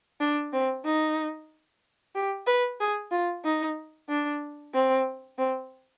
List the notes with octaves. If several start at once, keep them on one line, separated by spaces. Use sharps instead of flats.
D4
C4
D#4
G4
B4
G#4
F4
D#4
D4
C4
C4